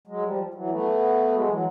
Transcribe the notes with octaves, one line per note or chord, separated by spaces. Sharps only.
F#3 G#3
F3 G3
E3 F#3
A3 B3
F#3 G#3
E3 F#3